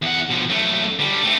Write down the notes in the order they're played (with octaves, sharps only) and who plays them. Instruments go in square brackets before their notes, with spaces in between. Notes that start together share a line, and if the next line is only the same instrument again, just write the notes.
[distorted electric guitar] E2 F#5
B2 F3
F#2 A3
D3 G3
A3 C4